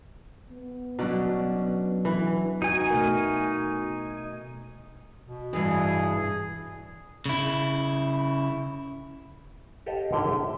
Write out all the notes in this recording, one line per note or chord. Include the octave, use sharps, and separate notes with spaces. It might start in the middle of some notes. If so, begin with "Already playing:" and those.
B3
B2 F#3 C#4 D4
E3
D#4 F#4 G#5
B2 A3 A#4
B2
G2 E3 G#4
C#3 E4
G4 A4 B4 C#5 D#5 F5
G#1 D3 E4 A#4 C#5 G5
E5